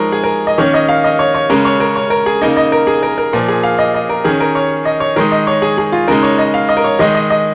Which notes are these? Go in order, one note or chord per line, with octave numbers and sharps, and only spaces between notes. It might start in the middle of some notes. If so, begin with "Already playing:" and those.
Already playing: F3 G#3 D#4 A#4 C#5
G#4
A#4
D#5
D#3 A#3 C#4 C#5
D#5
F5
D#5
C#5
C#5
C#3 G#3 C#4 A#4
C#5
A#4
C#5
A#4
G#4
C#3 A#3 D#4 D#5
D#5
A#4
G#4
A#4
A#4
A#2 F3 A#3
G#4
F5
D#5
D#5
A#4
D#3 C#4 G#4
A#4
C#5
D#5
C#5
D#3 G#3 D#4 A#4
D#5
C#5
G#4
G#4
F4
C#3 G#3 D#4 A#4
C#5
D#5
F5
D#5
A#4
C#5
D#3 G#3 D#4 D#5
D#5
D#5